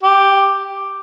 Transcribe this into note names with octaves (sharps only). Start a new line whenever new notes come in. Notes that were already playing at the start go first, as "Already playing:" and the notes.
G4